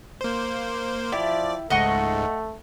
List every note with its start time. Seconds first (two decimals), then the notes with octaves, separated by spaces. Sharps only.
0.21 A#3 C5
1.12 F3 E4 G4 D5
1.70 C#2 G#2 A3 D#5 F#5 C#6